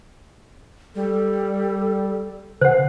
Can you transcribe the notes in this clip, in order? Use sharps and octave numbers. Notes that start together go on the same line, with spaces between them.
G3 A4
C#3 C5 F#5